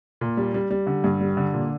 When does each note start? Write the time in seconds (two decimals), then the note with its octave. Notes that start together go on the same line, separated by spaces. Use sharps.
0.21 A#2
0.37 G3
0.54 G3
0.70 G3
0.87 D3
1.04 G2
1.21 G3
1.37 D3
1.54 A#2